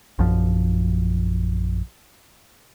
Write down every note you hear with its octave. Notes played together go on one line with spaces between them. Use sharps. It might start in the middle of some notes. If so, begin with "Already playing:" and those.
A#1 F#2 F3